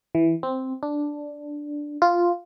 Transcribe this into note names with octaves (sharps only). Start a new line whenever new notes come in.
E3
C4
D4
F4